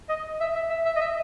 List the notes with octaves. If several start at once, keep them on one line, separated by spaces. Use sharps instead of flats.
D#5
E5
E5
E5
E5
D#5
E5